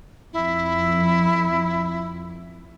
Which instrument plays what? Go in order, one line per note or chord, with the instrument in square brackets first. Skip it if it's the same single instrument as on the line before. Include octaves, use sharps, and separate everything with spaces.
[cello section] F2 [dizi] E4